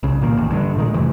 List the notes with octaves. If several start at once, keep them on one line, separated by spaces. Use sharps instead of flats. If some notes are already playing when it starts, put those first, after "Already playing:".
C2 C#3
A#2 D#3 A#3
E1 A1 D#2
G2 D3
A#2 D#3 G#3
F1 C3 E3 A3